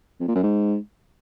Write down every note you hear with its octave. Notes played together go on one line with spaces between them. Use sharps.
F2
A#2
F#2
G#2